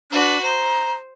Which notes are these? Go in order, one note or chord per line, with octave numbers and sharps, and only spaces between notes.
D4 F#4 B4
C5 A#5